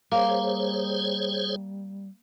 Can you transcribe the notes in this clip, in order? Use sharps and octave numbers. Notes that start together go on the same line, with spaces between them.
G3 A#3 G#4 C5 C#5